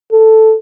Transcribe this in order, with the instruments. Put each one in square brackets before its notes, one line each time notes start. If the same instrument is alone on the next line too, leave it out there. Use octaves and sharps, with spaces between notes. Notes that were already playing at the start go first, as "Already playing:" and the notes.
[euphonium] A4